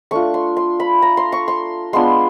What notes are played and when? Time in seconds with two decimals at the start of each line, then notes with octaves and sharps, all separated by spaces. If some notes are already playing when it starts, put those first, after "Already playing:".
0.11 A3 D4 F4 C#6
0.34 C6
0.57 C6
0.80 B5
1.02 A#5
1.17 C6
1.32 C#6
1.48 C6
1.93 G#3 B3 D4 F4 C6